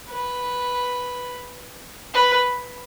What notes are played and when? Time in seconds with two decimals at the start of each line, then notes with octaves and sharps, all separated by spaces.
0.09 B4
2.14 B4